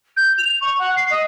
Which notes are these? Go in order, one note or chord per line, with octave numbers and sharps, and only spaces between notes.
G6
F7
C#6
F#5
C7
D#5